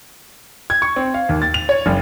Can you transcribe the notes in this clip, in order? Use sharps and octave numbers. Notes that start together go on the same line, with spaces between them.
G#6
C#6
C4
F5
D#2
A6
F7
C#5
F#1